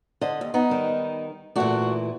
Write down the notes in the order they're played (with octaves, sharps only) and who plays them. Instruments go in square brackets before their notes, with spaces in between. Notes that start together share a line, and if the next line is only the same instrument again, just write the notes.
[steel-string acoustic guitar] D3 [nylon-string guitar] C5 D#5
[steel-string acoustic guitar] D#2
B3 D#4
[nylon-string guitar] D#3 G3
[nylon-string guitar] A#2 E3 A3 [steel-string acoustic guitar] D4 F#4